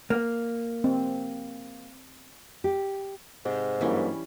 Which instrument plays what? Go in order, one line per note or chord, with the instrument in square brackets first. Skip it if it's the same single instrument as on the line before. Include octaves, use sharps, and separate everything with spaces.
[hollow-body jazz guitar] A#3
[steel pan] C4
[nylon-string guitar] G4
[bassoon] G#2 [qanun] C3
[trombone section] G2 F#3 A#3 [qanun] E3 G3 C#4